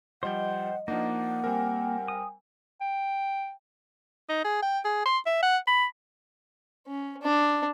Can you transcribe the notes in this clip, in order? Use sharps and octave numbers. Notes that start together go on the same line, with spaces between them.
F3 G3 C5 D#5 F#5 G5
F3 A#3 D4 D#4 F#5
G3 C4 A#4 G5 G#5
D#6
G5
D#4
G#4
G5
G#4
C6
E5
F#5
B5
C#4
D4